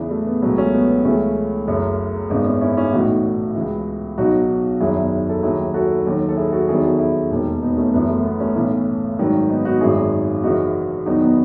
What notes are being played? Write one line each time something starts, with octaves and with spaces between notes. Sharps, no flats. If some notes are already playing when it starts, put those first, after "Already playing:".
Already playing: E2 C#3 E3 B3
A3
B3
C#2 B2 F#3 A3 C#4
A3 C#4
B3
B3
C#2 C#3 E3 A3 C#4
F#1 F#2 C#3
G#1 F#2 C#3 B3 D#4
C#4 E4
C#4 E4
C#4 E4
B1 A2 E3 D#4 F#4
C#2 C#3 E3
B1 B2 F#3 D#4 F#4
F#1 E2 D#3 F#3 E4 G#4
A4
D#2 D#3 F#3 E4 G#4
F#4 A4
D#2 D#3 F#3
A4
E4 G#4
F#4 A4
E2 D#3 F#3 E4 G#4
F#4 A4
E4 G#4
E1 D#2 D#3
B3 D#4
A3 C#4
F#1 F#2 E3 B3
A3
B3
A3 C#4
B1 A2 E3
G#1 G#2 D#3 F#3
B3 D#4
D#4 F#4
G#1 F#2 D#3 F#3 E4 G#4
F#1 F#2 C#3 E3 D#4 F#4
E2 D#3 F#3 D#4 F#4
B3 D#4